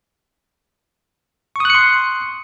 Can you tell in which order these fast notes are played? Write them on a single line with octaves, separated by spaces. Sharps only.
C#6 D#6 F#6 C#7 C6